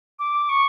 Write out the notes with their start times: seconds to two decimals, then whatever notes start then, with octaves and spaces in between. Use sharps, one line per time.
0.19 D6
0.49 C#6